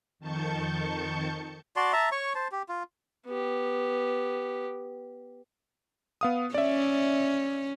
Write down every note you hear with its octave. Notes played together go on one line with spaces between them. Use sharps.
F2 D#3 A5 C#6 G6 C#7
F#4 D5 A5 C6
E5 A5 A#5
C#5 C#6
C5 A5
G4
F4
B3 G4
B3 F5 D#6
C#4 D5 E5